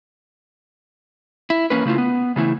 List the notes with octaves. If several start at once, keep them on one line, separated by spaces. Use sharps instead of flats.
E4
E2 A#3 C#4 B4
C#3 A3 E4 F4
B3
C#3 E3 A3 E4